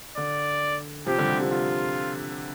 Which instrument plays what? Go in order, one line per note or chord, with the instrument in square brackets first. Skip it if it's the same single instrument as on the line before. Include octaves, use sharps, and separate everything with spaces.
[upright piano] D3 [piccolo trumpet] D5
[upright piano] C3 F3 [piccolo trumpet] G4
[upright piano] D3 G3
D3
C3 F3
[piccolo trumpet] F4